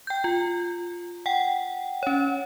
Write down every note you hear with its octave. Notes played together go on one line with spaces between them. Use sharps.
G5 G6
F4
F#5 G5
C#4 C#5